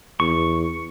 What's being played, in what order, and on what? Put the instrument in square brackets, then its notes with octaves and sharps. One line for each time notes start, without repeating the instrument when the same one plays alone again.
[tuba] E2 [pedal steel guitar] C#6